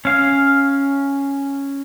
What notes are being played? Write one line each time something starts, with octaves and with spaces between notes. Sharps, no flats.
C#4 F5